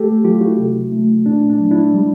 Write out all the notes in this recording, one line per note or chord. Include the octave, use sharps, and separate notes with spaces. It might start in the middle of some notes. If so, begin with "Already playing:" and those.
Already playing: A3 G4 A4
F#3 F4 G4
E4 F#4
C3
A3
A#2 D4
D4
F#3
D4 E4
G3